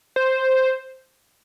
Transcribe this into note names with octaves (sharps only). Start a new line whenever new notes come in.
C5